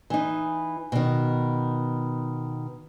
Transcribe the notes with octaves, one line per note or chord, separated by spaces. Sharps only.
E3 D#4
B2 D#3